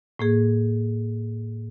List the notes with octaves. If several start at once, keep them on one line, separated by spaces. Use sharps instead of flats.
A2 A#3 G#4